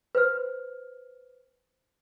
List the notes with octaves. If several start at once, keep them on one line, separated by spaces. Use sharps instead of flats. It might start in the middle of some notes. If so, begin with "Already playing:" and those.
B4 C5 F6